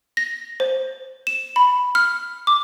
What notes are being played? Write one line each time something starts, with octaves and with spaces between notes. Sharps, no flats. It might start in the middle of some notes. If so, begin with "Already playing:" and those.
A#6
C5
E7
B5
F6
D6